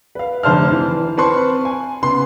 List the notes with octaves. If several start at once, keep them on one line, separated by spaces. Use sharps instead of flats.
B4 F5
F1 D3 C5 A5 F6
E3
C4 B4 A5 C6 C#6
G#5
C#3 B3 C6